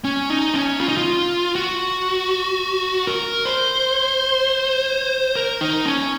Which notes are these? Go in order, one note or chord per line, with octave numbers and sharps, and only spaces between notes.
C#4
D#4
C#4
F4
D#4
F4
F#4
A#4
C5
A#4
D#4
C#4